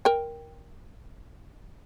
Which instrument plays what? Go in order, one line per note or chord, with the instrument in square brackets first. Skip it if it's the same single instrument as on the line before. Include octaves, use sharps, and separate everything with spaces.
[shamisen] A#4 G5